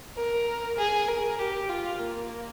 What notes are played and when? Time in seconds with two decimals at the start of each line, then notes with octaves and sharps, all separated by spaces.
0.16 A#4
0.77 G#4
1.08 A#4
1.39 G4
1.69 F4
2.00 A#3